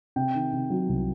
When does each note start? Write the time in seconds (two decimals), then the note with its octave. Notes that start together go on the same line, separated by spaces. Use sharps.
0.16 C3 G5
0.35 D#3
0.53 C3
0.70 F#3
0.89 C2